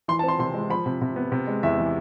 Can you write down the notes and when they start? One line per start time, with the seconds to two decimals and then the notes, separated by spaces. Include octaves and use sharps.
0.08 E3 C6
0.19 A5
0.23 C4
0.28 C6
0.39 C3 C6
0.54 G#3
0.70 F3 B5
0.86 C3
1.01 C3
1.16 B3
1.32 C3
1.47 G#3
1.63 E2 E5
1.78 E3